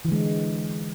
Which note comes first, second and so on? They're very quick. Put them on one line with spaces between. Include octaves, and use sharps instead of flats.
E3 D3 G#3